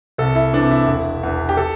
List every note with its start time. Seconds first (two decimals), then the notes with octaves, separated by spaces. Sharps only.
0.18 C2 A4
0.35 E4
0.53 C3 E3 D4
0.71 E4
0.87 E1
1.23 E2 E3
1.49 G4
1.57 A4